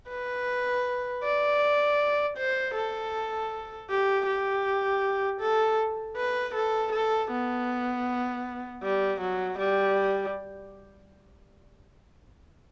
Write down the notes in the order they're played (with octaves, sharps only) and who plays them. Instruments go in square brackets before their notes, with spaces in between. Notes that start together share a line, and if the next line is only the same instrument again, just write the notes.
[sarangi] B4
D5
C5
A4
G4
G4
A4
B4
A4
A4
B3
G3
F#3
G3